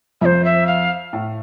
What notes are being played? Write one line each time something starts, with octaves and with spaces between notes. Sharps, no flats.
F2 F3 C5 E5
E5
F5
A2 A3